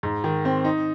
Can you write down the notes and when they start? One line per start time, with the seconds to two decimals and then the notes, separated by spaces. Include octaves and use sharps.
0.03 G#2
0.24 D#3
0.45 C4
0.65 D#4